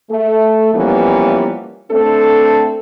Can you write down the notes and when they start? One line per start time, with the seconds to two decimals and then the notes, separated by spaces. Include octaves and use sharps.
0.11 A3 A4
0.74 E3 F3 G3 A#3 B3 C#4
1.91 A3 C4 D4 A4